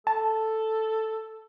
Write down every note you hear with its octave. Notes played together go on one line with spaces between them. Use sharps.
A4 A5